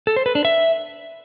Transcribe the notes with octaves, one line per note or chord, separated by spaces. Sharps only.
A4
C5
B4
D4
E5